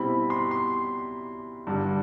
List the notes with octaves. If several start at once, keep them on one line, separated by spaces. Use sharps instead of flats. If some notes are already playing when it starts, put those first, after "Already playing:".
Already playing: B2 G3 C4 E4 B5
C6
C6
G2 D3 G3